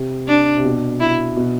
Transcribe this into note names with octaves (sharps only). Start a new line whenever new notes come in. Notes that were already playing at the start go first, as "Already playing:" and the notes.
Already playing: C3
D4
C3
B2
E4
B2